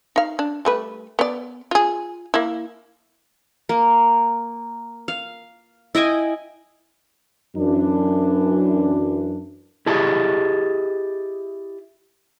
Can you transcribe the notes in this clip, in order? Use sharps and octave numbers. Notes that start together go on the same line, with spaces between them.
D#4 F5
D4
G3 A3 B4
B3 D5
F4 G#4
A#3 E4
A#3
F5
E4 D#5 G5 G#5
F#2 E3 D4
E4 G4 G#4 D#5 A5